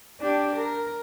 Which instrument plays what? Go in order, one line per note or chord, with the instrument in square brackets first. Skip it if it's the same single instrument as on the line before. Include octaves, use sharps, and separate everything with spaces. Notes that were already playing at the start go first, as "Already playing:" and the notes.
[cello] D4 G4
A#4